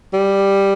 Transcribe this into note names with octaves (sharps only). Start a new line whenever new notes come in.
G3